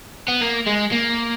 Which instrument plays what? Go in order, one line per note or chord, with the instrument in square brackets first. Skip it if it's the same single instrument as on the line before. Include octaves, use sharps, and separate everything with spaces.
[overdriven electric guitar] B3
A#3
G#3
A#3